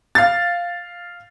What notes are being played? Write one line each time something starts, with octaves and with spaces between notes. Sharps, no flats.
F5 A6